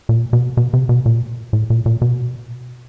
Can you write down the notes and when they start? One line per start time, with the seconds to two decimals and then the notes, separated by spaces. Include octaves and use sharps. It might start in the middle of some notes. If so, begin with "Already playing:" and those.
0.09 A#2
0.33 B2
0.57 B2
0.73 C3
0.89 B2
1.06 A#2
1.53 A2
1.70 A#2
1.86 A#2
2.02 B2